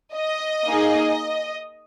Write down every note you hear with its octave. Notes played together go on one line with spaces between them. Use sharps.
D#5
A#3 D#4 G#4